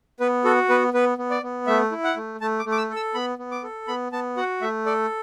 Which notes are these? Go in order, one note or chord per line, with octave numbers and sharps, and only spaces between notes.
B3 B4
F#4 A4
B3 B4
B3 B4
B3
D5
B3
A3 E5
E4
F#5
A3
A3 A5
D6
A3
D6
E6
A4
E6
B3 B5
B3
D6
A4
B3 B5
B3 A5
F#4 F#5
A3 E5
A4 D5